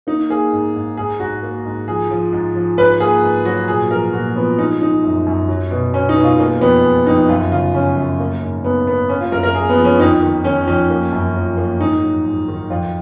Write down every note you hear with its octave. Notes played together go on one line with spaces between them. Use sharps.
A#3 D#4
A#3 G#4
G#2
G#2
G#2 G#4
G#2 F#4
A#3
G#2
F3 G#4
F3
G#2
F3
G#2 B4
A#3 G#4
G#2
F#3 F#4
A#2 G#4
F3 A#4
A#2 F#4
F3 B3
G#3 D#4
G#3 D#4
F#2
F#2
F#3
B2
B2 C#4
D#4
B2
F4
G#3 A#3
F2 B3
G#3
F2 D#4
F#2 F4
C#3 F4
C#3 C#4
F#2
A#3
G#2
G#2 B3
A#3 B3
A#3 C#4
F4
F#2 A#4
A#4
A#3 G#4
B3
F3
C#4
F2 D#4
D#3
D#3 C#4
F2 C#4
A#3
F#2
F3
A#3
G#2 D#4
F#3
G#2
D#3
F2 F4